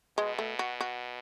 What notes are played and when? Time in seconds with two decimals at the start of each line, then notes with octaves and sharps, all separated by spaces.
0.18 B2 G#3
0.39 A3
0.59 F#4
0.81 F#4